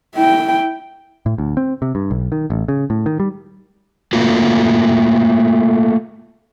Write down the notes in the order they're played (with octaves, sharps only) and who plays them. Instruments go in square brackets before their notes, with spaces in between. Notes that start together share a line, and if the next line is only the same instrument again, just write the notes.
[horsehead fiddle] E4 G5
[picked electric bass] A2
D2
C4
C3
G2
B1
D#3
A1
C#3
A2
D#3
G3
[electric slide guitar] A3 A#3 F4 F#4